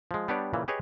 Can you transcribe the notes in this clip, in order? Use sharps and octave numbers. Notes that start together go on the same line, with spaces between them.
F3 G#3
G3 B3 D4 G4 C#5 D5
A#2 C#3 E3
G4 G#4 B4 C#5 D#5